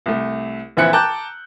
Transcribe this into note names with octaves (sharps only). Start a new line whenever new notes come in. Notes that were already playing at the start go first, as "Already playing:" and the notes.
C2 A3
A#1 E3 C4 E4 F#6 C#7
G5 A5 A#5 D6 F#6 G6